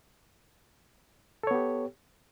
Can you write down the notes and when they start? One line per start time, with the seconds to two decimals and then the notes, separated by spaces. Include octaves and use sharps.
1.43 A4
1.47 C#5
1.51 B3
1.55 G4